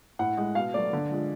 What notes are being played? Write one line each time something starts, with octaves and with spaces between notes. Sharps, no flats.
A2 F#5
G#3
B2 F5
F#3 A3 D5
D3
F3 G#3